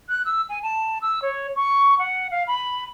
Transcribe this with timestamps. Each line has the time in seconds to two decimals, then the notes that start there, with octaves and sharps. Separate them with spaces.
0.08 F#6
0.25 E6
0.49 G#5
0.62 A5
1.01 E6
1.22 C#5
1.55 C#6
1.98 F#5
2.31 F5
2.47 B5